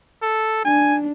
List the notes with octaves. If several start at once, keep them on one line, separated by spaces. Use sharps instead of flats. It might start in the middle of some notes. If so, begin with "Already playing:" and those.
A4
D4 G#5